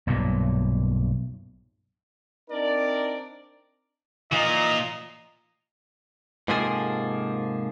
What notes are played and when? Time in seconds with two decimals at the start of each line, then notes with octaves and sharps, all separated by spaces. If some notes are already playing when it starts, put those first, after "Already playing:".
0.07 B1 G2 A#2
2.50 C4 D4 D#4 A#4 D5
4.32 A#2 E3 F3 D#4 D#5
6.48 G#2 C3 F3 A#3 G#4 A4